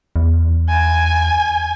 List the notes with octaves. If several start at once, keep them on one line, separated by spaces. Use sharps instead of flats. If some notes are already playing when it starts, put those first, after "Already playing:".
E2
G#5